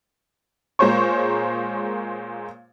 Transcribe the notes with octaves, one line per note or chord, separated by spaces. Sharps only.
A#2 G#3 A#3 C5 C#5 C#6